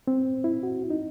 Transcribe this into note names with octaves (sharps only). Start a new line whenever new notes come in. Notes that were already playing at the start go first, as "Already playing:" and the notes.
C4
E4
F#4
D#4